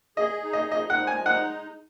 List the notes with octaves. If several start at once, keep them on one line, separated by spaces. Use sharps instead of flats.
G#4 D#5
D#4
D#5
F3 D#5
F#5
G#3
G#5
D#4 F#5